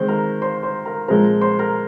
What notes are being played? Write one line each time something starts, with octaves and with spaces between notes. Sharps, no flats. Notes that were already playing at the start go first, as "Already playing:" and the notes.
Already playing: D#3 G#3 C4 C5
A#4 A#5
C5 C6
C5 C6
A#4 A#5
A#2 F3 G#3 C4 A#4 A#5
C5 C6
A#4 A#5